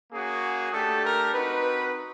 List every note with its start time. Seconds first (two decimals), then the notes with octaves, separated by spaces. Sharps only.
0.12 A#3 C#4 F#4 G#4
0.73 A3 D4 G4 A4
1.03 A#4
1.34 C4 D#4 F#4 B4